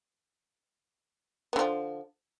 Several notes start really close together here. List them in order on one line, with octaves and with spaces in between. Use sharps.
B3 D3 F3